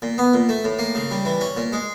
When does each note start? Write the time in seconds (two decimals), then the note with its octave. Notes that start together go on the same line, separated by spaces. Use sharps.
0.02 A#2
0.18 B3
0.34 A#2
0.49 A3
0.64 A2
0.79 A#3
0.95 C#3
1.11 G3
1.25 E3
1.41 C#4
1.57 A#2
1.73 G#3